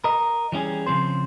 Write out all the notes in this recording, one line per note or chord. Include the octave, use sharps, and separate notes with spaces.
A#4 D#5
E3 G3 C#4 G#4
C#3 F3 C4 C5